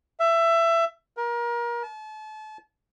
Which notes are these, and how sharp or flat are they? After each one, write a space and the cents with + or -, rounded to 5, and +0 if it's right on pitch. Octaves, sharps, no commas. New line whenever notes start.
E5 +20
A#4 +30
A5 -35